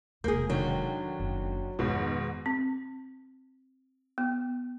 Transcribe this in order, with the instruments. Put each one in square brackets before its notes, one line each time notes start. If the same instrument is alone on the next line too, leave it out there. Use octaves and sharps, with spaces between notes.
[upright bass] E1 C3 [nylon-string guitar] A#3 G#4 [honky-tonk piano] G6
[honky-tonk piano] D3 D#3 [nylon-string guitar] F#3
[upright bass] F#1
[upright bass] F2 D#3 [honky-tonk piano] G#2 B2
[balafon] C4
B3